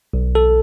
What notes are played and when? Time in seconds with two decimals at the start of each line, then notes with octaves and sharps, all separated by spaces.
0.13 B1
0.35 A4